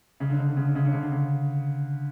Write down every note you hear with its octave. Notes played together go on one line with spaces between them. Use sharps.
C#3
D3
C#3
D3
C#3
D3
C#3
D3
C#3
D3
C#3